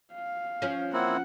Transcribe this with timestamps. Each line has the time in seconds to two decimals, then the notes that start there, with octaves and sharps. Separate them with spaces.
0.14 F5
0.62 F3 C#4
0.93 A#3 C4 E4 F#5